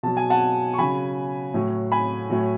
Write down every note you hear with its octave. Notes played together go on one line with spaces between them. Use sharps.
B2 F#3 A5
G#5
F#5 A5
C#6
C#3 F#3 G#5 B5
A2 F#3
G#5 B5
A2 F#3